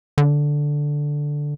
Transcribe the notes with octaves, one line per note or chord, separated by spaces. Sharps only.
D3